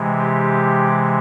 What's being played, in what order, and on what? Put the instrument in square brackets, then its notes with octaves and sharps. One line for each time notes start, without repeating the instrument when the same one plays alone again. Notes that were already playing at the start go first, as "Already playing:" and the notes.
Already playing: [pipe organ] C3 E3 G#3
G4